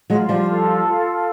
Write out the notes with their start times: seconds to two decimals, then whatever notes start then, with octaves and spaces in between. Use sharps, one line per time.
0.10 F#3 G#3 F4
0.29 F3 G3
0.48 A4
0.87 F4